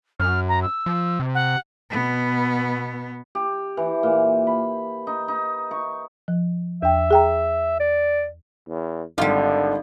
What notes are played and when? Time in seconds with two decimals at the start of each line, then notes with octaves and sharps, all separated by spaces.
0.20 F#2 F6
0.49 A#5
0.62 E6
0.86 F3
1.20 C3
1.35 F#5
1.90 B2 B3
3.35 G4
3.77 E3
4.03 A#2
4.47 B5
5.07 D#4
5.28 D#4
5.71 C#6
6.28 F3
6.82 E2 E5 G5
7.11 G#4 G5 A#5
7.80 D5
8.68 E2
9.18 G#1 D3 G3 F4